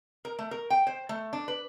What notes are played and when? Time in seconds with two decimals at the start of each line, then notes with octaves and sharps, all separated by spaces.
0.25 A#4
0.39 A3
0.51 A#4
0.70 G5
0.87 C5
1.09 A3
1.33 D4
1.48 B4